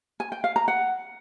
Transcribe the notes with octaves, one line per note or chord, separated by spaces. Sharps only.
G#5
G5
F5
A#5
F#5